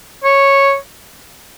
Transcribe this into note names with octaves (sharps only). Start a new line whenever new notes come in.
C#5